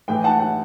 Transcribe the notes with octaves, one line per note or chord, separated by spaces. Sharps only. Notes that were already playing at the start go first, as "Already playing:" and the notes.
A2 E3 G5
F#5 A5
F#5